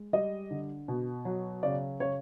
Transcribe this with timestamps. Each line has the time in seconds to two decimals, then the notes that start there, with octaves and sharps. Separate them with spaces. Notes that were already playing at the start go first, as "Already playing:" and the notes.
Already playing: G#3
0.13 G3 D#5
0.50 D3
0.88 B2
1.25 F#3
1.63 C#3 D5
2.00 C#3 C#5